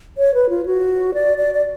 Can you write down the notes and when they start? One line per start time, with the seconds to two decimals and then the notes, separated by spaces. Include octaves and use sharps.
0.18 C#5
0.34 B4
0.49 F4
0.66 F#4
1.14 D5
1.38 D5
1.54 D5